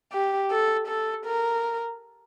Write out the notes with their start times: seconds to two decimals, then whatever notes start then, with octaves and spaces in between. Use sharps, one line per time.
0.12 G4
0.50 A4
0.88 A4
1.25 A#4